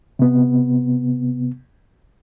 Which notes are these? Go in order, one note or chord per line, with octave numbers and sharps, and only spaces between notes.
C3 B3